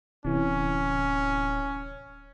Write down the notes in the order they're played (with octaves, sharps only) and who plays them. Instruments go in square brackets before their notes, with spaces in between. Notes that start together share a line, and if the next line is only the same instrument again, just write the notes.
[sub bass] D1 [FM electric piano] C3 E3 [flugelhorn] C#4